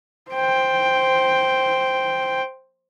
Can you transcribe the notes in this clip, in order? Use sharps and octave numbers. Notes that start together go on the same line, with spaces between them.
C5 G5